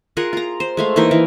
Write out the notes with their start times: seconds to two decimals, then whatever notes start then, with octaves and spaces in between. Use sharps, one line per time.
0.17 F4 G#4 A#4 F#5
0.33 F4 A#5
0.60 C5
0.77 G#3 A3 F5
0.96 E3 A#3 D#4 A#4
1.11 E3